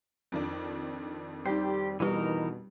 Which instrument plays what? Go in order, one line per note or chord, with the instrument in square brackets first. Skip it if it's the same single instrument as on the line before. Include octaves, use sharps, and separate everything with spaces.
[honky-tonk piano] F2 D#3 D4
[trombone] G3 [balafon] D#4 G5 [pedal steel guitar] G4 C5
[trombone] B2 [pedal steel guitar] E3 D#4 A#4 [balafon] G3 G4 B4